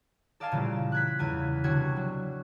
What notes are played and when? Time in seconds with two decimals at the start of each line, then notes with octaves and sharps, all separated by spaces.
0.40 A4 D5 D#5 F5 G#5 A5
0.52 A#2 C#3 E3 G3 A3 A#3
0.92 F#6 G#6 B6
1.19 E2 C#3 G#5 G#6
1.64 C2 D3 F#4 C#5 C#6 G#6
1.95 B2 F#3